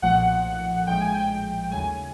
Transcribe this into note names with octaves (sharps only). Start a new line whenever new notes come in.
B1 A#2 F3 A3 F#5
A#1 A2 F3 G#3 G5
G#5
G5
D#2 C#3 F#3 A3 G#5